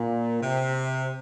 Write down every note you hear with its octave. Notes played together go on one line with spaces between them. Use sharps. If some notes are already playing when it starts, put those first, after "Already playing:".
Already playing: A#2
C3